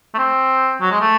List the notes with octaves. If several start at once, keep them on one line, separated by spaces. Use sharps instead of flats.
A3
C4
F#3
G#3
A3